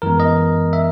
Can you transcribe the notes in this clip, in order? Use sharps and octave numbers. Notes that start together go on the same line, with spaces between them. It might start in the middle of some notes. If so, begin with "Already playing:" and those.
F#2 E3 G#3 B3 A#4
D#5
E5